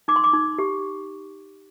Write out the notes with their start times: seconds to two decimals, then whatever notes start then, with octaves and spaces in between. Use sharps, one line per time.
0.08 D#4 D6
0.16 C6
0.24 D6
0.33 D#4
0.58 G4